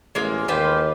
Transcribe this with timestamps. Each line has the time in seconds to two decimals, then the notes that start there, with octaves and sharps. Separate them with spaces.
0.15 A1 G#3 A#3 F4
0.48 D#2 F4 G4 B4 C5